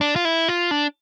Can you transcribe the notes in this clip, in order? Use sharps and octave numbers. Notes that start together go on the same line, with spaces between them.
D4
F4
E4
F4
D4